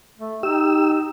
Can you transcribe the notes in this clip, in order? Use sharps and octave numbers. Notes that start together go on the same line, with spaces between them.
A3
D#4 G4 E6